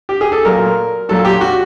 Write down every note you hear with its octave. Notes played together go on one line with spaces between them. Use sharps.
G4
G#4
A4
A#2 F#3 A3 A#4
A#2 F#3 A3 A4
G4
F#4